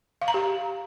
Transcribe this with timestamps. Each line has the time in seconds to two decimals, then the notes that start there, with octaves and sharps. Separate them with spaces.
0.22 F5
0.28 A#5
0.34 G4